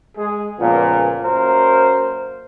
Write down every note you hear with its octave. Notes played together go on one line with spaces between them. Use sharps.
G#3 G#4
C#2 A#2 F3 A#3 B3
F#2 A#3 A#4 C5